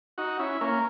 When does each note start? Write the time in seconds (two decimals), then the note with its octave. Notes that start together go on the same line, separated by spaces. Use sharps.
0.18 D#4 F#4
0.39 C#4 E4
0.61 A#3 C#4